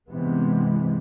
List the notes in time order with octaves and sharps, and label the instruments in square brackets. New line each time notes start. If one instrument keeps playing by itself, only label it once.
[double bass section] G2 C3 E3 G#3 B3